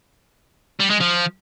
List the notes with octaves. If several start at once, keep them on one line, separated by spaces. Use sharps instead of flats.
G3
G#3
F3